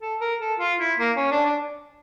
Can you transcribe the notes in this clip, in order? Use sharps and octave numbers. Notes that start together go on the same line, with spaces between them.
A4
A#4
A4
F4
E4
A#3
C#4
D4
D4